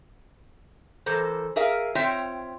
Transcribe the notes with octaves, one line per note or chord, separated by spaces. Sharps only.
E3 A4 A#4 C5
G#4 A#4 E5 F5
C4 F4 C5 C#5 E5 G5